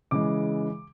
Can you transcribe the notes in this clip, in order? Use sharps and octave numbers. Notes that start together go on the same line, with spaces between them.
C#3 E3 G#3 D6